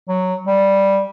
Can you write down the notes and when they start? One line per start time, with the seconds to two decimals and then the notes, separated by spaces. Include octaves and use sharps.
0.08 F#3
0.47 G3